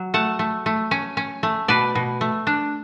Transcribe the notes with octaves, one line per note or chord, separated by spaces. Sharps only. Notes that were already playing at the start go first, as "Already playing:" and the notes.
Already playing: F#3
A3 F#5 A5
A3
A3
C#4
C#4
A3
B2 B4 D5
B2
A3
D4